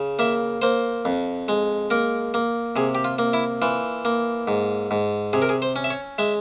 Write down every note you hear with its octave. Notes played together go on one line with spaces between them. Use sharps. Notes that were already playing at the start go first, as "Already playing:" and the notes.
Already playing: C#3
A#3 E5
A#3 C5
F2
G#3
A#3 A#4
A#3
C3 G#4
G4
F4
A#3
E4
E3 F4
A#3
G#2
G#2
C3 G#4
A#4
G#4
C5
C#4
E5
C#5
G#3 E5